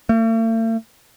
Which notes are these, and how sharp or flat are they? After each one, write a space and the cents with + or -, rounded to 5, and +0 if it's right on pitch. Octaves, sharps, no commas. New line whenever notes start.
A3 +45